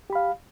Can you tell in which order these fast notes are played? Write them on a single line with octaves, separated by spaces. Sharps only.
G4 B5 F5